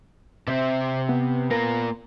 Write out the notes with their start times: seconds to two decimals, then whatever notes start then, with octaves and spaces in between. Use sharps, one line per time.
0.47 C3 C4 C5 E5
1.09 B3
1.51 A#3 F4 A#4